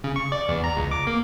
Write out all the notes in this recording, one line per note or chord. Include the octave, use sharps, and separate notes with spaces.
C#3
C#6
D5
E2
A#5
C#2
D6
A#3